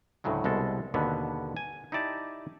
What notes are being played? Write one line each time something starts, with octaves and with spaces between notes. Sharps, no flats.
D2 A2 C#3 F#3 G#3
C2 B2 G#3 A4
D#2 B2 D3 B3
G#5
D#4 E4 G4 D5 A5